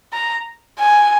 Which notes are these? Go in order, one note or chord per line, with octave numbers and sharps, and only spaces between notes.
A#5
G#5